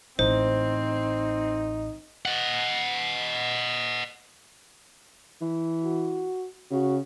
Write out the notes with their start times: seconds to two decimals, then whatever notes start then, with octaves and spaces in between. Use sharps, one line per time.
0.19 A1 C4 D#4 C5
2.25 D#5 F#5
5.41 E3
5.84 F#4
6.71 C#3 F#4